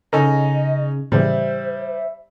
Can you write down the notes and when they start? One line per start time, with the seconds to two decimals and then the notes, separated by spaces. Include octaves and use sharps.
0.13 C#3 C#4 D#4 A4 D#5
1.12 A2 C#3 E3 G3 C5 E5